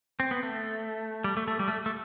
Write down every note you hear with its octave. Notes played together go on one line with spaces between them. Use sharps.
C4
B3
A3
G3
A3
A3
G3
A3
A3